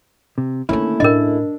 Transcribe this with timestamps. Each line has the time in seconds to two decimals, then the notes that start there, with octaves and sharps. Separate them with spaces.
0.38 C3
0.69 D#3 A3 A#3 C#4 D4 E4
1.00 A2 D4 A#4 D#5